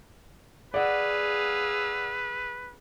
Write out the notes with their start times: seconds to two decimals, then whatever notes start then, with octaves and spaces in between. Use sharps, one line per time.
0.74 G#4 B4 D5 F5 F#5 E6